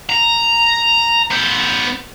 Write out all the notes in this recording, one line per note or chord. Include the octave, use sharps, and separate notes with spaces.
A#5
B3 C5